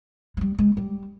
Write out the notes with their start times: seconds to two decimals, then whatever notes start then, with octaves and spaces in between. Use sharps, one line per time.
0.37 G#3
0.41 G3
0.58 G#3
0.77 G3